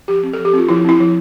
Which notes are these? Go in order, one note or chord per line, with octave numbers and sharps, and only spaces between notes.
F3 G4
C4
F3 A4
G4
C4 F4
F3 E4
C4 E4
F3